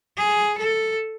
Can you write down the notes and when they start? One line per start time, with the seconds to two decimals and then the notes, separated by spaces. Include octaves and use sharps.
0.17 G#4
0.58 A4